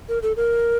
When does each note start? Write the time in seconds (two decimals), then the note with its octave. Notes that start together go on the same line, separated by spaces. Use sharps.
0.09 A#4
0.23 A4
0.37 A#4